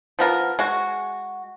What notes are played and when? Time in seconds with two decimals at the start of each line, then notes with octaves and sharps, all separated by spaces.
0.19 F3 B3 A#4
0.59 G#3 F#4